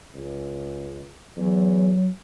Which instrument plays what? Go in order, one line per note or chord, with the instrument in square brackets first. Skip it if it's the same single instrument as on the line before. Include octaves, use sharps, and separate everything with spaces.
[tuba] C#2
[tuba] E2 [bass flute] F#3